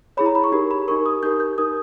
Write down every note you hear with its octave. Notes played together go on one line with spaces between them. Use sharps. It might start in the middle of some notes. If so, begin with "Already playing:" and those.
E4 G#4 C#5 B5
A#5
B5
C#6
D#4 G4 A#4
B5
D#4 G4 A#4 C#6
D#6
D#4 G4 A#4 G6
G6
D#4 G4 A#4 D#6